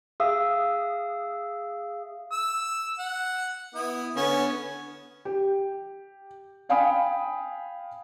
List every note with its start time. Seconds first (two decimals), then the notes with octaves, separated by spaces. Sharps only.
0.20 G#4 E5 F5 D#6 E6
2.31 E6
2.99 F#5
3.75 B3 E4 D#6
4.16 D3 B3 C#4
5.25 G4
6.69 D5 F5 G5 G#5 B5 D#6